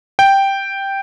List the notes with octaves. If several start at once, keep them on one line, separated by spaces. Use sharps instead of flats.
G5